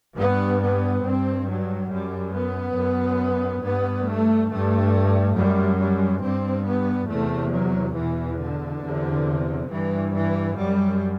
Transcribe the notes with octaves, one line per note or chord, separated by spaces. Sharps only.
G2 B3
B3
G2 C4
F#3
F#2 G3
B3
F#2
G2 B3
A3
G2 A3
F#2 G3
G3
G2 C4
B3
E2 C3 A3
F#3
E2 B2 E3
D3
E2 C3
G2 E3
E3
F#2 G3